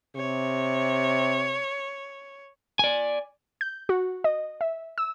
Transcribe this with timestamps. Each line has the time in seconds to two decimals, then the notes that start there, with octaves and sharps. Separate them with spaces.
0.16 C3 C#5
2.79 D5 G#5
3.61 G6
3.89 F#4
4.24 D#5
4.61 E5
4.98 E6